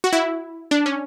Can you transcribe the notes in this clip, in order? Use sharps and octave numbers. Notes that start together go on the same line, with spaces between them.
F#4
E4
D4
C#4